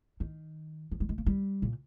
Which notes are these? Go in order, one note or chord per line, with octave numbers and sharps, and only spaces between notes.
D#3
F3
G3
G#3
A#3
G3
A#2